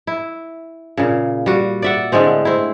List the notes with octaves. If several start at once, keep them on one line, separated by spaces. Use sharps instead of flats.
E4
A#2 C#3
G3 F#4
D5 E5 F#5
A2 D3 G#3 C4
C4 E4